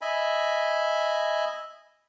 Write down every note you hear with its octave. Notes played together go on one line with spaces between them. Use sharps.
D#5 E5 G#5 B5